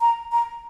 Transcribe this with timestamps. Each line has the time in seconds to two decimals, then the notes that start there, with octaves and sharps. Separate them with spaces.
0.01 A#5
0.32 A#5